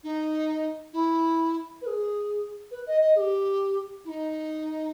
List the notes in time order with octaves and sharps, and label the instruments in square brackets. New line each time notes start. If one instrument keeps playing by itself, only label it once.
[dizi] D#4
E4
B4
G#4
B4
D#5
D#5
G#4
G4
E4
D#4